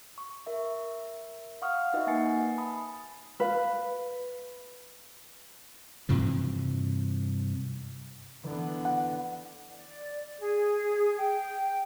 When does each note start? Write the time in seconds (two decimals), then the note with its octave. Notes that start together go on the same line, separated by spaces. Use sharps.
0.18 C#6
0.47 A#4 E5
1.62 F5 F#5 C#6 D#6 F6
1.94 D#4 F#4 B4 D#5 E5
2.07 A#3 F#5 G#5 A6 C7 C#7
2.58 A5 B5 D#6
3.40 B4 F5
6.09 G2 C3 E3 F3
8.44 D3 E3 B3
8.85 F#5
9.68 D5
10.38 G#4
11.16 G5